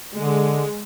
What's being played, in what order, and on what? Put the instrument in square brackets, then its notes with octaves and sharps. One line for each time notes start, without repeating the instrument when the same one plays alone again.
[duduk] D3 [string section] G#3